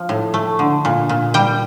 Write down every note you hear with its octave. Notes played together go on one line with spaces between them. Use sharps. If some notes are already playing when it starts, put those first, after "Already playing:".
Already playing: F3
A2
A3
D3
A#2
A#2
G3 G5